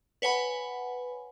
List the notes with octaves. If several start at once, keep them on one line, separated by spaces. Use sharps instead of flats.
B4 C#5 F#5 G#5 B5